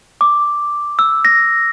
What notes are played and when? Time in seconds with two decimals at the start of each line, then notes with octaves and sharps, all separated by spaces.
0.21 D6
0.99 E6
1.25 A#6